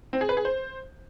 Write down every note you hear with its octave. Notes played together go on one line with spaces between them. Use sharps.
C4
G#4
B4
G#4
C5